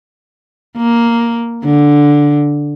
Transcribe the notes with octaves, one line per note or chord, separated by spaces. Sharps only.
A#3
D3